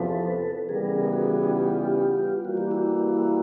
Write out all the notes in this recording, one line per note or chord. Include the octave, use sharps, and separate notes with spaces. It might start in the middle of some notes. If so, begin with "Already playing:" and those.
Already playing: E2 C3 F3 A4 B4
C#3 E3 G3 B3 G#4 A#4
F#4 G#4
F4 G4
E3 G3 A#3 F#4
G4
E4 F#4